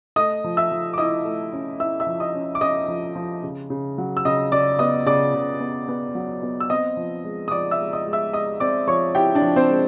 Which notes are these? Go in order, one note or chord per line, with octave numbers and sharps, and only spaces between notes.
A3 D#5 D#6
F3
E5 E6
F3
D6
E4 D#5 D#6
A3
C#4
E4 E5 E6
E5 E6
F3
D#5 D#6
C#4
D6
C#4 D#5 D#6
F3
F3
C#3
C#3
F#3
E6
C#3 D#5 D#6
C#3 D5 D6
B3 D#5 D#6
C#3 D5 D6
C#3
B3
B3
F#3
B3
E6
C4 D#5 D#6
F3
G#3
D#6
F3 D5 D6
E5 E6
G#3
D#5 D#6
G#3
E5 E6
G#3 D#5 D#6
C4 D5 D6
F3 C#5 C#6
E4 G4 G5
D4 D5
F3
C4 C5
G#3